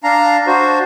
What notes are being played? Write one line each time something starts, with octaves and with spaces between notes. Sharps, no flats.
D4 F5 A#5
D4 F#4 C5